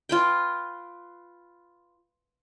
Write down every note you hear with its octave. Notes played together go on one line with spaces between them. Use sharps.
F4 B4 G5